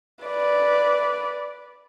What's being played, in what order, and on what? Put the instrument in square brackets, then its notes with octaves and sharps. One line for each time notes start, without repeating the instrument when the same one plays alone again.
[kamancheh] B4 D5